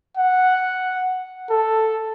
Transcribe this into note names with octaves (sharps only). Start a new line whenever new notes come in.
F#5
A4